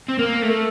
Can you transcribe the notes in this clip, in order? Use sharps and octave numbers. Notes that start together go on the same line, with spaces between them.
C4
A#3 A#4
A3
A4